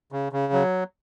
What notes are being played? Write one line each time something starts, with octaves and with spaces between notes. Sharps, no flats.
C#3
C#3
F#3